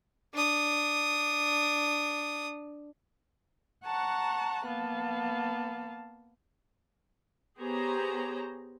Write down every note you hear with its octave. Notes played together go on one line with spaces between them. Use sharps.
D4 D#6
F#5 A5 A#5 C#6 F#6
A#3 B3 F5 A5
B3 G4 G#4 C5 C#5 A#5